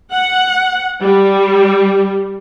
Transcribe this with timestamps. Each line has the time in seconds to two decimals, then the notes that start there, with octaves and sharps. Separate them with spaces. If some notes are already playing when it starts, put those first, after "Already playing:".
0.11 F#5
1.03 G3